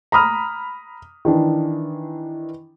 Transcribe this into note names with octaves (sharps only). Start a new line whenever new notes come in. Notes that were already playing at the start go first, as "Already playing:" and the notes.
A#5 B5 D#6 F6
D#3 E3 D4